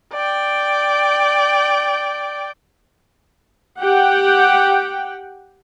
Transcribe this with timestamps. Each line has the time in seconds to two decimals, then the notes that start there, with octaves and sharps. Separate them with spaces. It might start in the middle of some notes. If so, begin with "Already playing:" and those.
0.14 D5 G5
3.81 G4 F#5 G5